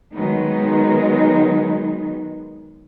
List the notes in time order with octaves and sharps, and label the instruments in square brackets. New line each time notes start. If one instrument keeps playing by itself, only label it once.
[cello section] D#3 F#3 G#3 B3 D#4